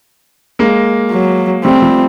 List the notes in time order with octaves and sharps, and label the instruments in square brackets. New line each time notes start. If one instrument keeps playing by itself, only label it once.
[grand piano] G#3 A#3
[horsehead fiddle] F#3
[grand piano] G3 A3 [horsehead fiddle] C4
[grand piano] F3 G3